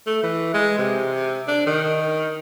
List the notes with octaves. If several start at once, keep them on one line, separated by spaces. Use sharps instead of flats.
A3
E3
G#3
C3
D4
D#3